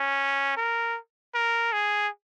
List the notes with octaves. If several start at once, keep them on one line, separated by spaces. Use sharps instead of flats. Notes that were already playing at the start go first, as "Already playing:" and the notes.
Already playing: C#4
A#4
A#4
G#4